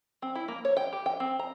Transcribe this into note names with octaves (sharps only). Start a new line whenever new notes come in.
C4
E4
A#3
C#5
G5
G4
G5
C4
A#5